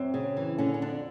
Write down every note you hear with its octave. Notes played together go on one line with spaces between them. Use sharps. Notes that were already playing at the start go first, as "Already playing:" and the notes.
Already playing: F#2 C4
C#3
E3
D3 C#4
C#4
F2 D4